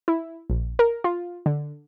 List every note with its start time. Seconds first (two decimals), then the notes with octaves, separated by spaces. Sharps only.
0.08 E4
0.50 A#1
0.79 A#4
1.04 F4
1.46 D3